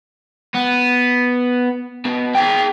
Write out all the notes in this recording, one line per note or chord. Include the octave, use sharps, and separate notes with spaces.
B3
B2
G#4 G5